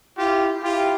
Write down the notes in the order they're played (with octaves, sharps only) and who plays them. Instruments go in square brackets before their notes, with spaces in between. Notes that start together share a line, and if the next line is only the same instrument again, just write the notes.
[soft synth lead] E4 [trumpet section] F4 G4
[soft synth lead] E4 [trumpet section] F4 G4